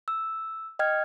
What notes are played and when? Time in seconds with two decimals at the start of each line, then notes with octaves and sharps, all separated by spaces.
0.08 E6
0.79 D#5 G5 F6 G#6